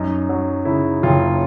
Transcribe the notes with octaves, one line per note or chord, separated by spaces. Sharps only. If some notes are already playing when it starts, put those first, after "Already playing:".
Already playing: F#2 D#4
F#3
C#3 E4
F#1 F4